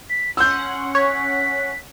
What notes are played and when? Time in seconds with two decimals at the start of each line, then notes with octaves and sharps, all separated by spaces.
0.09 B6
0.37 C#4 F#5 C6 E6 G6
0.95 C#5 B6